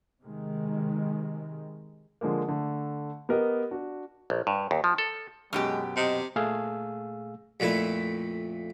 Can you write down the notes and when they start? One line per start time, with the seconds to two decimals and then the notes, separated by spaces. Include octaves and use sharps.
0.24 C3 D#3 G#3
2.21 D3 F3 G#3 A#3
2.48 D3 A3
3.29 B3 G4 A#4 D#5
3.71 D4 F#4
4.30 A#1
4.47 G2
4.71 D#2
4.84 F3
4.98 A4
5.53 F#2 B2 G#3 G4
5.96 C3 D#5
6.36 A#2 A3 G#4 F5 E6
7.60 F2 A#2 A3 E4